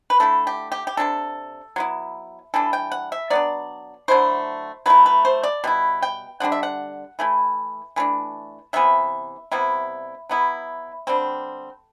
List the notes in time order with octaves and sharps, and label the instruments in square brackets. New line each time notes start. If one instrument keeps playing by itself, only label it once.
[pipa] B4
D3 A3 E4 A4
G4
G4
G4
C3 G3 D4 A4
F#3 B3 E4
E3 G3 D4 A4
G5
F#5
E5
F#3 B3 D4 D5
D3 F#3 A3 E4 C5
F#3 A3 E4 B4
B4
C5
D5
B2 G3 E4
G5
D3 G3 D4 F#5
E5
F#5
E3 A3 E4
E3 A3 D4
C3 E3 B3 E5
C3 G3 B3 E4
F#3 B3 E4
D3 G3 C4